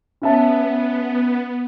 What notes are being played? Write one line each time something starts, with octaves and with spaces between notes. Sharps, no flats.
B3 C#4 E5 A5